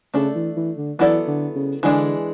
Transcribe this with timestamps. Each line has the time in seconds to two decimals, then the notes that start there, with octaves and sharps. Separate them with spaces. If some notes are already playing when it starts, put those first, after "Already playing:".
0.14 C#3 A3 D4 A4
0.35 E3
0.56 E3
0.77 D3
0.99 E3 F#3 B3 E4 A4 D5
1.27 D3
1.56 C#3
1.83 D3 E3 G#3 D4 G#4